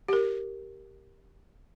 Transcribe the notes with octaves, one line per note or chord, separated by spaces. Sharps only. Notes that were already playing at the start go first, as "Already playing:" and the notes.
G4 A#4